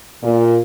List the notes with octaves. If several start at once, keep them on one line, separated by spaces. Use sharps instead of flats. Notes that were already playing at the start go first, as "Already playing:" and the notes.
A#2